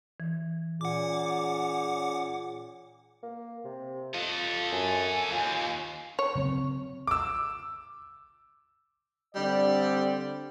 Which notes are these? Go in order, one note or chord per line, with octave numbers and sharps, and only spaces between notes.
E3
A#2 C#4 G#4 F#5 D6
A#3
C3
F4 A4 D#5
F#2 G#5
D#2 F4
C#5
C#3 F#3 C4
D6 E6
D3 G3 C4 D5